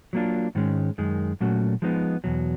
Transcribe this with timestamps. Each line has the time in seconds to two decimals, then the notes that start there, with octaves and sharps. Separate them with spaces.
0.13 F#3 A#3 D4 F4
0.55 G#2 D#3 G#3 C#4
0.98 F#2 D#3 G#3
1.41 A#2 F#3 A3 C#4 F#4
1.82 F3 G#3 B3 D#4
2.24 E2 B2 F#3